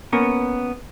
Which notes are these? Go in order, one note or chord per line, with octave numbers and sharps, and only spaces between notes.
A#3 B3 C#4 A#4